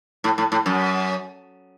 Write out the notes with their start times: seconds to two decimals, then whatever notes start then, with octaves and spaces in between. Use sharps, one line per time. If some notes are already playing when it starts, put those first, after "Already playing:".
0.24 A2
0.38 A2
0.52 A2
0.66 F#2